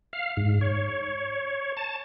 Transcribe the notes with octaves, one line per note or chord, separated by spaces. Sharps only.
F5
G#2
C#5
A5